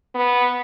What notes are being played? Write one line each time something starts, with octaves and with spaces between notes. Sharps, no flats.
B3